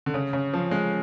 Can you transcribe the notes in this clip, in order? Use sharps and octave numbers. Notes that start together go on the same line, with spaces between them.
D3
C#3
C#3
F3
G#3